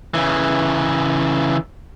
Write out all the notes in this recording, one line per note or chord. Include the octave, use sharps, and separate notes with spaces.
C#3 E3